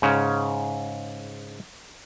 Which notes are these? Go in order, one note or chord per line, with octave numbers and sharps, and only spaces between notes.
G#2 C#3 C#4